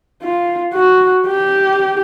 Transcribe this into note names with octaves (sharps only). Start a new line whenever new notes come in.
F4
F#4
G4